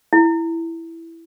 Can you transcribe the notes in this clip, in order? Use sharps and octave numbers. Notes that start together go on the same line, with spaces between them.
E4